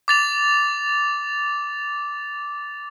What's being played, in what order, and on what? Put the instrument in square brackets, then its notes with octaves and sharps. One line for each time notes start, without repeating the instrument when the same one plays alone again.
[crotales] D6 A6 F7